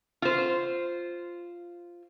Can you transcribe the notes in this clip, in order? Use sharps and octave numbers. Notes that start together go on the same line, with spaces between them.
F4 C5